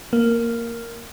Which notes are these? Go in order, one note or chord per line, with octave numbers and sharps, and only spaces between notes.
A#3